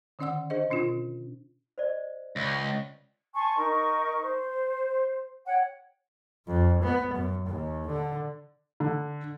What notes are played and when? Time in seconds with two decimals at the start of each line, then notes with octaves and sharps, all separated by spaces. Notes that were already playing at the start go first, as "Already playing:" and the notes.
0.19 D3 D#3 C#4 D5 F#5 E6
0.50 D4 G#4 C5 D#5
0.70 B2 C#4 D4 F4
1.78 C5 D5 D#5
2.36 C#2
3.34 G#5 A5 C6 C#6
3.56 D#4 A#4 D#5 C#6
4.22 C5
5.47 C#5 F#5 G5
6.47 F2
6.83 B3
7.14 F#2
7.47 D#2
7.87 D3
8.80 D3